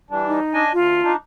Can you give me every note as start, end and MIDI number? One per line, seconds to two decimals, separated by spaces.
0.10 0.40 52
0.10 0.40 55
0.10 0.40 62
0.27 0.62 63
0.53 0.73 62
0.53 0.73 75
0.53 0.73 80
0.73 1.02 38
0.73 1.12 65
1.04 1.16 62
1.04 1.16 63